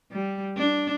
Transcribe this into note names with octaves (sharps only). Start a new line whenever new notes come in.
G3
D4